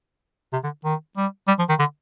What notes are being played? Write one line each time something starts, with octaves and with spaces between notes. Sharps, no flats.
C3
D3
D#3
G3
G3
F3
D#3
D3